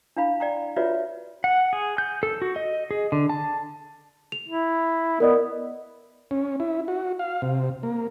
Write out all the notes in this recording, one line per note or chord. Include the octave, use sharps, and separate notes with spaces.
D4 E4 F5 B5
D5 G5 A#5
F4 F#4 B4 C#5 D5 E5
F#5
G#4
G6
A4
F#4
D#5
G#4
D3
A5
F7
E4
B3 A#4 D5 D#5
C#4
E4
F#4
F5
C3
A#3